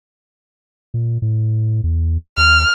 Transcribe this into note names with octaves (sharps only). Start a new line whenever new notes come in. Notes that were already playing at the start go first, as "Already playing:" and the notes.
A#2
A2
E2
D#2 F6